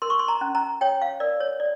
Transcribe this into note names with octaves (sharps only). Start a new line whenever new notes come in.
A#4 C6
C#6
C6
A#5
C#4
A#5
C#5 G5
F5
A#4 D5
C#5
D5